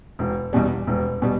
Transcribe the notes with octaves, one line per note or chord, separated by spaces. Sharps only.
E1
E2 B2 G3
E1
B2 G3